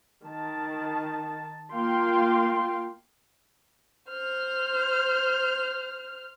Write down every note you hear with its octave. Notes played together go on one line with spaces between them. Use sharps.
D#3 A5
A#3 F4 F5 G5 C6
C5 F6